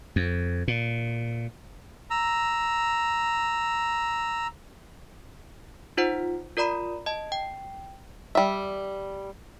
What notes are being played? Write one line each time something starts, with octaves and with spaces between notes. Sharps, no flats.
F2
A#2
A#5 E6
D#4 F4 C5 F#5
F4 A#4 D5 A#5 B5
D#5 A5
G5
G3 E5